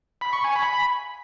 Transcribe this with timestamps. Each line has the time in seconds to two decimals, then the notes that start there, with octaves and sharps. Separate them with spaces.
0.21 B5
0.33 C#6
0.44 G#5
0.56 B5